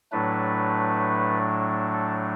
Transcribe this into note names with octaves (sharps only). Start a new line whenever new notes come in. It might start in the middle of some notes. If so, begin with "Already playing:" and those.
A2 F#3 A3 D4 B4
A4